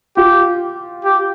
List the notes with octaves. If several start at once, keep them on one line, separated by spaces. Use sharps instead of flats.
F4 G4
G4